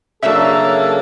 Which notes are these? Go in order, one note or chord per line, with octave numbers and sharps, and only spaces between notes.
C#3 F#3 A#3 D4 A4 E5